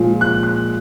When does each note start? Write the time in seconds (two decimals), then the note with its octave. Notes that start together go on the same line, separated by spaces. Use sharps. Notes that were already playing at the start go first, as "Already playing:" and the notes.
Already playing: A#2 F3 G#3
0.21 F#6
0.43 F#6